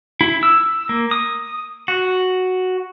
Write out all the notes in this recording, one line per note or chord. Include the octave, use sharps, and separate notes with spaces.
E4
E6
A#3
D#6
F#4